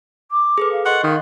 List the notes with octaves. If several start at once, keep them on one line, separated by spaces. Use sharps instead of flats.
D6
G#4 A4 B4
F5
A#4 D#5 F#5 C6 C#6
D#3 F5